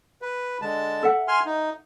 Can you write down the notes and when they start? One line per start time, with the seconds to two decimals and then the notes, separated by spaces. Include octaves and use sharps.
0.22 B4
0.62 D3 G#3 A5
1.03 A4 E5 F#5
1.28 G#5 C6 F6
1.46 D#4